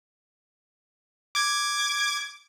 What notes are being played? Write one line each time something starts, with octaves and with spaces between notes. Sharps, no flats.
D6 G#6